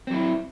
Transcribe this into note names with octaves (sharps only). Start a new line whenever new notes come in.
F#3 C4 E4